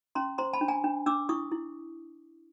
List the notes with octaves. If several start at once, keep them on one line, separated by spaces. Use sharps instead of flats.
C#4 A#5 C6
C5 A#5 C6
A5 B5
D4
G#5 A#5
D4
D4 D6 E6
E4 C#6 D#6
E4